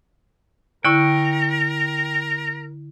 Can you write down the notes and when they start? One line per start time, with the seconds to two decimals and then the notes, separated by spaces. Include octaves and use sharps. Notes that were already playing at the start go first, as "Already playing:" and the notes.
0.85 D3 E4 A#4 G5 C#6